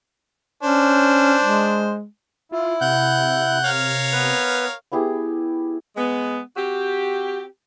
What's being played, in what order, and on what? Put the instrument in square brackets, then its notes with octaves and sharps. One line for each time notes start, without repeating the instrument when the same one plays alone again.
[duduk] C#4 [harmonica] D4 C5
[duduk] G#3
[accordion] E4 [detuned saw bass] F4
[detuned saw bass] C3 [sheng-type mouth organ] F#5 F#6 G6
[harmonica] A#4 C#5 F5
[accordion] B3 [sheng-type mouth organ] B4
[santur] B3 E4 G4 G#4
[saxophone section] G#3 B3
C4 F#4 G4